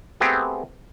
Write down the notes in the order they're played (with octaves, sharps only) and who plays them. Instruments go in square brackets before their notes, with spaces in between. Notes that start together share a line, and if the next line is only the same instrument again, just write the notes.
[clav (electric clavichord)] A3 B3 C4 G4 G#4